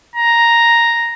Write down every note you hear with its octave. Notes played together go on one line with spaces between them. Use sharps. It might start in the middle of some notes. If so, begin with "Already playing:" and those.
A#5